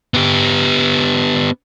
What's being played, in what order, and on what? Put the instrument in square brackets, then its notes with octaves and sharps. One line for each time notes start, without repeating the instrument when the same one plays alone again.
[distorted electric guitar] B3 G4